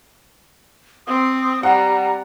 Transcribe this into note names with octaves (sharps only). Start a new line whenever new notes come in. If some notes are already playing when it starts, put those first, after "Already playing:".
C4 D#6
G3 F#5 A#5